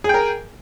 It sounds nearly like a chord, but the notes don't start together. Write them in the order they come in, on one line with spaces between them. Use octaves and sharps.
G#4 G5 A#4